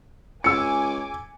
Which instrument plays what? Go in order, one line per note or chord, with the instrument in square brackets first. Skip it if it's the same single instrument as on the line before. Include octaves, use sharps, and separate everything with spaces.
[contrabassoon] C#2 [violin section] G#5 D6 [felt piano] E6 C#7